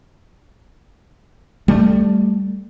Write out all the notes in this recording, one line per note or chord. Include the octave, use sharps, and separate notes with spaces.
G3 A3